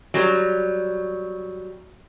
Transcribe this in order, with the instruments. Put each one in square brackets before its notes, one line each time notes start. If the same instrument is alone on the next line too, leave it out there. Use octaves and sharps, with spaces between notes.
[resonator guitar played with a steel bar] F#3 G3